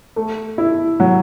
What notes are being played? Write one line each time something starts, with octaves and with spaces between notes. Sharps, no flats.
A3
E4
F#3